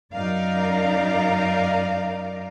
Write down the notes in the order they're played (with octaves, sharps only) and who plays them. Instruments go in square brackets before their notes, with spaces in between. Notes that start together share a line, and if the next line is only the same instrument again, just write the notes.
[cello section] F#2 D#4 A#4 D5 F5